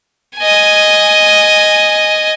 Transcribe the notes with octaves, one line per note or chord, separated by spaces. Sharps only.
D#5 G#5